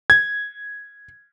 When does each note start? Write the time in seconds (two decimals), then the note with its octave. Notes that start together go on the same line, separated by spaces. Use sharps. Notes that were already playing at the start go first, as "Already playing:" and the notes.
0.10 G#6